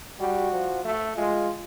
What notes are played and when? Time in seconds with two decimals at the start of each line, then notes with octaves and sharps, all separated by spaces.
0.20 G3 F#4
0.52 F3
0.85 A3
1.17 G#3 F4